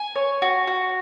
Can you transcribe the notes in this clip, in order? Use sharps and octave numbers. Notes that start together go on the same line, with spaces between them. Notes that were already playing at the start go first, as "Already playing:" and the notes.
Already playing: G#5
C#5
F#4
F#4